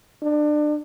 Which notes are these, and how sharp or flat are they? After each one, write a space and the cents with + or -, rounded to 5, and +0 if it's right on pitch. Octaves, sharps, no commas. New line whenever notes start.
D4 +30